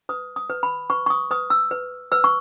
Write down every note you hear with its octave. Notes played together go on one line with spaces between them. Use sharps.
B4 D#6
D#6
B4
B5
B4 C#6
C#6
D#6
B4 D#6
E6
B4
B4 E6
C#6